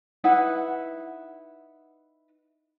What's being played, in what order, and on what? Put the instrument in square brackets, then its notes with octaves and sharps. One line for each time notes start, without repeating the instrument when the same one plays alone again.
[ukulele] D#4 E4 B4 F#5